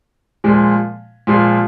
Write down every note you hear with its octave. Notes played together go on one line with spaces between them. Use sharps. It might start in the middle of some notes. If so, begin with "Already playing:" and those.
A#2 F3 G#3
A#2 F3 G#3